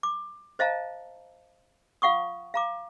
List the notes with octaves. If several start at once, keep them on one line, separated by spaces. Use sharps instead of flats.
D6
C5 D#5 F5 A5 A#5
F4 F5 F#5 C#6 D#6
F5 A#5 D6